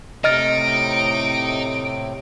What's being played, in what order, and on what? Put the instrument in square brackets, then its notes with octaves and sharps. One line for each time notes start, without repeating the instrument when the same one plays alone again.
[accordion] A2 C3 [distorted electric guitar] D#4 [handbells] D#5 F6 A6 [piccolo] D7